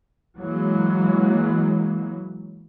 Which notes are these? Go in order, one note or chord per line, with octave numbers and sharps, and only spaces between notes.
E3 F#3 G#3 A#3